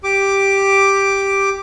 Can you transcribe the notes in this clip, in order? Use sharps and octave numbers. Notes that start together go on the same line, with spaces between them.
G4 D6